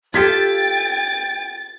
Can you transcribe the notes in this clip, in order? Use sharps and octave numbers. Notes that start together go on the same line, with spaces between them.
F4 G4 A4 G5 G#6 A6 B6